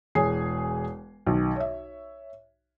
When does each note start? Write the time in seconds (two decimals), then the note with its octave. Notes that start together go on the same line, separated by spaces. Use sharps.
0.15 E1 G#4 C#5 G#5 C7
1.27 B1 D#3
1.56 C#5 E5